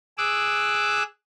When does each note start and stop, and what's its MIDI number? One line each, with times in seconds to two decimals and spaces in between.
0.18 1.03 68
0.18 1.03 86
0.18 1.03 88
0.18 1.03 90